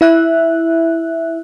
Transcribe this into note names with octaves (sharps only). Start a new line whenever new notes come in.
E4 E5 F#6